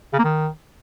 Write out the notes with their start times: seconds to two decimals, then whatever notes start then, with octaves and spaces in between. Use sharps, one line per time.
0.13 C#3
0.19 A#3
0.24 D#3